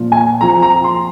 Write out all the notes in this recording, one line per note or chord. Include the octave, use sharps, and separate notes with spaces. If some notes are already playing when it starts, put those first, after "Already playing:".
Already playing: A#2 F3 A#3 F4
G#5
F3 C4 F4 A#5
A#5
C6